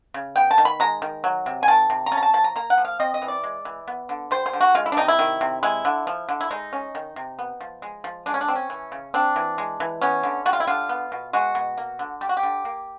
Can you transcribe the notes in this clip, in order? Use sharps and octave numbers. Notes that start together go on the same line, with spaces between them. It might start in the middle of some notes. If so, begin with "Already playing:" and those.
C#3
B3 G5
A5
D#3
B5
G#3 A#5
D#3
F#3
C3
G#5
D#3 A5
C3
A#5
C#4 A5
A#5
A5
F3 A5
A#5
A#3 A#5
F#5
F3
F5
C4 D#5
D#5
E3
D5
G#3
E3
B3
D3
G3 C5
C5
D3
F#4
G#3 F4
E4
D4
C3 D#4
E4
D#3
C3
G#3 E4
D3
F3
D3
E4
G#3 D#4
C#4
D#3
C3
B3
F3
G#3
F3
G#3 D4
C#4
D4
C4
C#4
E3
C#3
C4 D4
E3
G#3
E3
B3 C#4
D3
G3 F#4
F4
E4
D3 F4
B3
B2
G#3 F#4
B2
A#3
D3
G3 G4
F#4
G4
D3
A#3